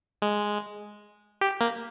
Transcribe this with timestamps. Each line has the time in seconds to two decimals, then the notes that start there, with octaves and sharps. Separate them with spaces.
0.22 G#3
1.41 G4
1.61 A#3